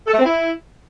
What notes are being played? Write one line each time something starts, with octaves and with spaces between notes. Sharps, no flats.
A4
A3
C4
E4